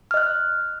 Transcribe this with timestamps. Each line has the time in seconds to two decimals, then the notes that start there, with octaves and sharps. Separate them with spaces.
0.11 F6
0.14 D#5
0.17 F#6